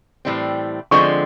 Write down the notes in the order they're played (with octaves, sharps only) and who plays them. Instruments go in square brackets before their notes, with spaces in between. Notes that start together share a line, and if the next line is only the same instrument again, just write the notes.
[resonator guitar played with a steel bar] A2 E3 G3 C4
[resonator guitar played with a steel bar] D3 F3 G#3 C4 [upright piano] C#6